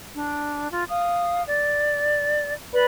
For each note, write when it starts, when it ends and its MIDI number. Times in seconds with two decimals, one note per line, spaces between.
0.14 0.67 62
0.71 0.83 65
0.89 1.41 77
0.89 1.41 87
1.47 2.52 74
2.73 2.85 71
2.73 2.85 74
2.73 2.85 83